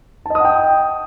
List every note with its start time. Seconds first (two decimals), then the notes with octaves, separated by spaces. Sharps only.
0.26 A5
0.30 D#5
0.35 D#6
0.40 F#5
0.45 G5